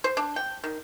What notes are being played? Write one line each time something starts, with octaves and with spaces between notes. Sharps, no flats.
C5
D4
G5
D#3